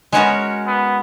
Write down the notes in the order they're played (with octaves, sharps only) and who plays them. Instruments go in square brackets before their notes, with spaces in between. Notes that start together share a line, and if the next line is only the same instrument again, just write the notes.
[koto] G#3 C#4 F#4 A#4 C#5 [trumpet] B3
[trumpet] B3